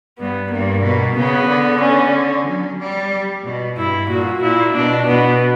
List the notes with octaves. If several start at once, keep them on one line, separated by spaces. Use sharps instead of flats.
G2 B3
G2 A#3
B2
C#3 B3
D3
C#4
F#3
G3
B2
G2 E4
A#2 F#4
A#2 E4
B2 D4
B2 B3